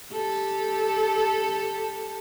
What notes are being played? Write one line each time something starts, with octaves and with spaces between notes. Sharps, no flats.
G4 A4